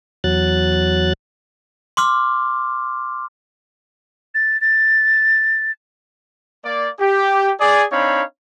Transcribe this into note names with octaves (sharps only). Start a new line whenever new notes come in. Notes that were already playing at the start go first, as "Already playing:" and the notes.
E2 F#3 F#6 A6
C6 D6 F6
A6
A6
A#3 D5
G4
G#4 D5
C4 D4 D#4 C#5 F5 B5